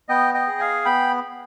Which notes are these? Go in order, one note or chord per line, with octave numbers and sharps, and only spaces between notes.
B3 D#5 G5
D#5 G5
G#4
F5 G#5
B3 G5 B5